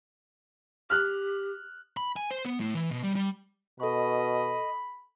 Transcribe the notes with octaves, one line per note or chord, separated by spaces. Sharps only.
G4 F6 F#6
B5
G#5
C5
B3
A2
E3
B2
G3
G3
B2 A4 D#5 B5 C#6